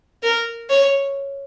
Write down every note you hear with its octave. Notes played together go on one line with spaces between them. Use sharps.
A#4
C#5